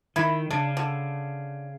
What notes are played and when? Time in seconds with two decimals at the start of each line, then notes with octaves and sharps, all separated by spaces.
0.16 D#3 E4 B5
0.51 C#3 D4
0.77 D3